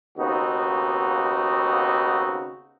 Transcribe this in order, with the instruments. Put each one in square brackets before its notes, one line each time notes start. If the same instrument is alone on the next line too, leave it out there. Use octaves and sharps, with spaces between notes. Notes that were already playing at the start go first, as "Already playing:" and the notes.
[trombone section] D#2 C#3 B3 C4 D#4 F#4